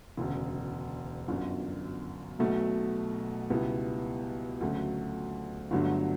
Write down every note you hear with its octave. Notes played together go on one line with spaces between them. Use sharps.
E1 D2 C#3
G1 F#2 D3
B1 B2 F#3 A3
C#2 B2 G3 B3 E4
D2 C#3 F#3 A3
G1 G2 D3 F#3 A3